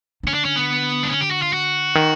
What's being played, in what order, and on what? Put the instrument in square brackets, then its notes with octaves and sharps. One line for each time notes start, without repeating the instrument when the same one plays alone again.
[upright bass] D3 [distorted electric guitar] C#4
[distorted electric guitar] D4
C#4
B3
D4
C#4
G4
F#4
F4
F#4
[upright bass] D#3